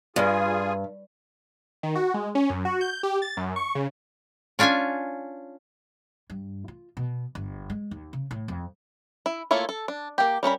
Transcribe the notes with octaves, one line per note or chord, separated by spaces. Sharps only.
G2 F4 G#4 G#5
D#3
F#4
G#3
C#4
F#2
F#4
G6
G4
A6
F#2
C#6
C#3
C#4 D4 F4 F5 G#5
G2
F4
B2
G1
G#3
D#2
C#3
A2
F2
E4
A3 A#3 E4 F4 C#5
A4
D4
A#3 G4
G3 C#4 A#4 B5